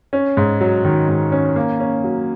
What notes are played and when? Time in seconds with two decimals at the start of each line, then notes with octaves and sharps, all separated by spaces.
0.13 C#4
0.37 G#2
0.61 F#3
0.85 D#3
1.08 G#2
1.32 C#4
1.56 A#3
1.80 C#4
2.04 F#3